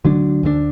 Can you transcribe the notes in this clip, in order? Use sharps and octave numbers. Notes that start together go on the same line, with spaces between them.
D2 D3 F#3 D4
D2 D3 F#3 D4